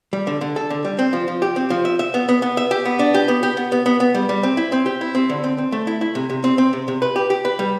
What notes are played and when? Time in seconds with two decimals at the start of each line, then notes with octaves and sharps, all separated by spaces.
0.13 G3
0.27 D3
0.41 D3
0.56 A4
0.70 D3
0.85 G3
0.99 C4
1.13 F3
1.28 F3
1.42 G4
1.56 C4
1.70 F3
1.85 E5
1.99 E5
2.14 B3
2.29 B3
2.42 B3
2.57 E5
2.71 G4
2.85 B3
2.99 D4
3.14 G4
3.28 B3
3.43 G4
3.57 B3
3.72 B3
3.86 B3
4.00 B3
4.15 G3
4.29 G3
4.43 C4
4.57 E4
4.72 C4
4.86 G4
5.01 E4
5.15 C4
5.30 D3
5.44 C4
5.58 C4
5.72 A3
5.87 E4
6.01 E4
6.15 C3
6.30 C3
6.44 C4
6.58 C4
6.73 C3
6.88 C3
7.02 B4
7.16 G4
7.30 G4
7.45 B4
7.59 G3